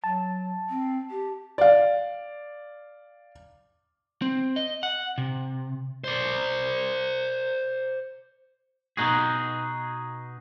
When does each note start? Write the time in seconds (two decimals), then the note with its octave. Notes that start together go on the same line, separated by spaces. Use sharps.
0.04 F#3 A5
0.70 C4
1.10 G4
1.58 D5 F5
4.22 C4
4.56 D#5
4.83 F#5
5.18 C3
6.04 C5 D5
8.97 B2 D#4 F#4 G#4